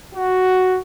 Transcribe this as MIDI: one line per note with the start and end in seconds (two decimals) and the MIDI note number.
0.14 0.78 66